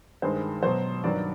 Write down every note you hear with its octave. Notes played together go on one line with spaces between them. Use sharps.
G2 D#3 G#3 C5
B2 F#3 C5
G2 D#3 F#3 D5